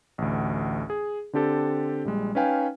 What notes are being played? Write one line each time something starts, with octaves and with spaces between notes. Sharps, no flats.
A1 D2
G#4
D3 C4 D4 G4 A4
A#1 G3 G#3
C#4 D#4 B4 F5 G5 G#5